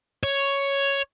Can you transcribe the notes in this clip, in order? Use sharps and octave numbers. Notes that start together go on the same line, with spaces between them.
C#5